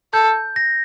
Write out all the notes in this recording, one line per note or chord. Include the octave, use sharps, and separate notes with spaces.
A4 G6
A#6